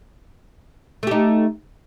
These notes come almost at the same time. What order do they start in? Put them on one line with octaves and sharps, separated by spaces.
A3 G4 D#4